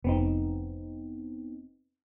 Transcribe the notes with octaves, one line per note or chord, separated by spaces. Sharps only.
F1 B3 C4 D#4